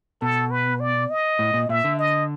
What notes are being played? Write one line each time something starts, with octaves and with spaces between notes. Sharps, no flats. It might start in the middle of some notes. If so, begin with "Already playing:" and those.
B2 A4
B4
D5
D#5
A2
A#2
A#2 E5
D3
D#5